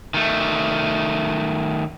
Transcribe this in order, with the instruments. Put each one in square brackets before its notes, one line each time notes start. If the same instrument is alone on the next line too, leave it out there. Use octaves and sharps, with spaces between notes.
[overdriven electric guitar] D#3 A3